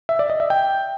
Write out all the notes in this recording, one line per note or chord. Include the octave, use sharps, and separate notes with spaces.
E5
D5
D#5
E5
G5